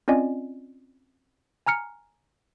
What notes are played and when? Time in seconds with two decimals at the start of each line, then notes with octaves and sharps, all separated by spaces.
0.08 C4 C#4 F4 D5 D#5 G#5
1.66 G#5 A#5 F6 C#7